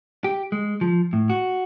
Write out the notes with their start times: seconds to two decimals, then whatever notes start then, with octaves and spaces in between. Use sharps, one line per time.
0.24 G4
0.52 G#3
0.81 F3
1.13 A2
1.30 F#4